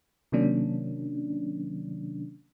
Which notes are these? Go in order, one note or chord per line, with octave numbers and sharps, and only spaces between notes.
C3 D#3 F#3 A#3 C#4 D4